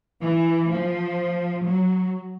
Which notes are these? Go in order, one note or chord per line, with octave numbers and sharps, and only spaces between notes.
E3
F3
F#3